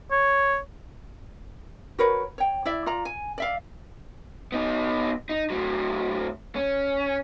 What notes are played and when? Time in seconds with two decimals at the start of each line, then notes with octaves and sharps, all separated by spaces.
0.11 C#5
1.99 F#4 A#4 B4 C#5
2.38 C#5 G5
2.65 E4 D5 E5
2.86 F4 D5 A#5
3.05 G#5
3.38 D5 E5 F5
4.52 B3 D#4
5.29 D#4
5.50 A2 F#3
6.56 C#4